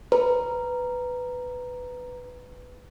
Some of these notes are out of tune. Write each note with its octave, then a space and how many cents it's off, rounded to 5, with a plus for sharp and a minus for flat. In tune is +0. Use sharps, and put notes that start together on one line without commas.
B4 +10 A#5 +0